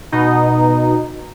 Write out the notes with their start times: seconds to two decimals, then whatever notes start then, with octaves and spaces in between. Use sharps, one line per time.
0.12 B2 D#4